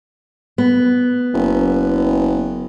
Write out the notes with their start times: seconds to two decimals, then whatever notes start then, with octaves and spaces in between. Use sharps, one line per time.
0.58 B3
1.34 F#1